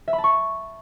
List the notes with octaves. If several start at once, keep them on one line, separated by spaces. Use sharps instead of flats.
E5
B5
A5
C#6